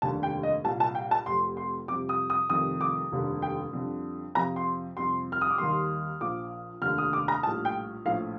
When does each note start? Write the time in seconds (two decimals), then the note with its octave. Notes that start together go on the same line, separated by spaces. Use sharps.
0.02 F1 D#2 D3 G3 A5
0.23 G5
0.43 D#5
0.64 C2 A#2 G3 A5
0.80 A5
0.95 G5
1.11 A5
1.26 F1 F2 C3 C6
1.57 C6
1.88 F2 C3 G3 D6
2.09 D#6
2.30 D#6
2.49 F1 F2 D#3 G3 D#6
2.81 D6
3.12 F1 D#2 D3 G3
3.42 G5
3.73 F2 D3 G3
4.35 F2 C3 F3 A#5
4.56 C6
4.97 F2 C3 G3 C6
5.32 F6
5.41 D#6
5.50 D6
5.58 D#2 D#3 G3 C6
6.20 A#1 A#2 F3 D6
6.82 F1 D#2 D3 F6
6.98 D#6
7.13 D6
7.28 A#5
7.43 A#1 A2 G3 A5
7.65 G5
8.05 A#1 A2 F3 F5